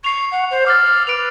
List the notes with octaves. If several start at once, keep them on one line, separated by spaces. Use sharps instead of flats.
C#6 C7 F7
F#5
C5
D6 E6 F6 A6
B4 D6 D7 F7